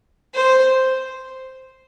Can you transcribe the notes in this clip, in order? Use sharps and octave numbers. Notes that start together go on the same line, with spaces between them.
C5